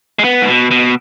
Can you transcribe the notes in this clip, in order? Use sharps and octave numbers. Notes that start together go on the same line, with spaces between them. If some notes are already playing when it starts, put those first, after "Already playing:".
G#3
B3
G#2
B2
B2